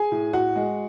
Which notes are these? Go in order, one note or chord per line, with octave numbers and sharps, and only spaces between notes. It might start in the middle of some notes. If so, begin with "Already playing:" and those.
Already playing: G#4 G#5
A2
A2 F#4 F#5
G#3